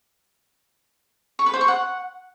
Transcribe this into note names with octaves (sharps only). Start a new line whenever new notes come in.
C#6
B4
C5
C#6
F#5